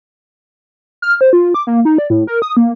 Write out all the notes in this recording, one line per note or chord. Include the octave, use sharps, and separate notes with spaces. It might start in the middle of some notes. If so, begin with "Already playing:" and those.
F6
C5
F4
D6
A#3
D#4
D5
A2
A#4
D#6
A#3